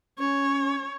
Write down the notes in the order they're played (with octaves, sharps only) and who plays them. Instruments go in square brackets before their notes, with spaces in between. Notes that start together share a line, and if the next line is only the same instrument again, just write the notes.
[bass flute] C#4 [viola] C#5